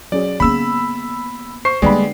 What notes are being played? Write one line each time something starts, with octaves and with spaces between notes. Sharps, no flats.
F#3 C#4 G#4 D5
C#3 A#3 B3 B5 E6
C5 C#6 C7
D3 G3 G#3 A#3 B3 G4 D5 B5